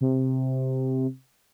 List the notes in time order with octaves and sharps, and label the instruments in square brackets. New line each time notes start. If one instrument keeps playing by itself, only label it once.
[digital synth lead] C3